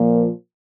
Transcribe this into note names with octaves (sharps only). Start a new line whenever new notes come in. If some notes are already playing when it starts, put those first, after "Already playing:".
Already playing: A#2 F3 A#3